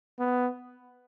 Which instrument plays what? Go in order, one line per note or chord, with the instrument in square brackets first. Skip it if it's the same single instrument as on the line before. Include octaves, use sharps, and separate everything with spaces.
[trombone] B3